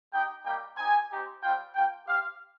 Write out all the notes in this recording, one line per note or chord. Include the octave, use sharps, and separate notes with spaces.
G#3 D#4 G4 G5
G3 A#3 D#4 G4 G5
C4 D#4 G4 G#5
C4 D#4 G4
G3 C4 F4 G5
A#3 F4 G5
C4 G4 F5